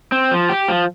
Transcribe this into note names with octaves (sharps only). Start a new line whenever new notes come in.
C4
F3
G4
F3